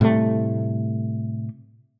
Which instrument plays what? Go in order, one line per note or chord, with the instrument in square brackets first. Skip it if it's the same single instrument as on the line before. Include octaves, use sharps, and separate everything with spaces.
[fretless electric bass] A2 C3 G3 A3